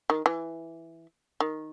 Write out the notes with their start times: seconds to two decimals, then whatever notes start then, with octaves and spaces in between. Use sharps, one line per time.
0.10 D#3
0.26 E3
1.40 D#3